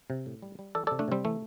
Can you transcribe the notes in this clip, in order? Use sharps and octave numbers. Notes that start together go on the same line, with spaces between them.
C3
A2
G3
G3
E3 A4 D5
C3 A4 D5
A3 D4
C3 G3 C4
E3 A3